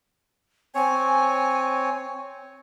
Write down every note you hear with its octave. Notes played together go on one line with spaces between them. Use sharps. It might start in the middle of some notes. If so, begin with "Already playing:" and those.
C4 C#5 G#5